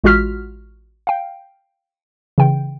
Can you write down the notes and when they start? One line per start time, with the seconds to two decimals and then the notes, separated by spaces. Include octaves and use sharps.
0.04 A1 G#3 F4 F#4 F6 B6
1.07 F5 G5
2.38 C#3 E3 G5